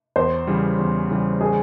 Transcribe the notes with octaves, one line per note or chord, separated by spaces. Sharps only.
E2 C5
C#3 E3 G3
E2
C#3 E3 G3
G#4